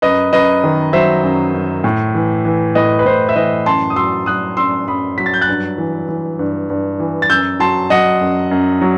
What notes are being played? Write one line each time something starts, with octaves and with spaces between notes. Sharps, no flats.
F#2 B4 D#5
F#2 B4 D#5
D#3
F#3 C5 E5
F#2
F#2
A2
E3
E3
A2 B4 D#5
B4
A2 C5
E5
E3 B4 D#5
F#2 A5 C6
D#6
F#3 C6 E6
F#3 D#6 F#6
F#2 C6 E6
F#2 B5 D#6
F#3 B6
A6
G6
F#6 A6
G2
E3
E3
G2
G2
E3
A6
F#2 E6 G6
F#3 A5 C6
F#3 D#5 F#5
F#2
F#2
F#3